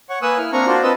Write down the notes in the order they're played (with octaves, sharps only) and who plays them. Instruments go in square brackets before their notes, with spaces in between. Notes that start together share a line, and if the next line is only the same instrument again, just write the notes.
[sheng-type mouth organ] C#5 F#5 C#6
A#3 B4 G#5 D#6 E6 F#6
E4 F6
A#3 C4 D4 A#5 C#6 F6
D4 F4 F#4 C5 D5
C4 B4 D#5 A5 E6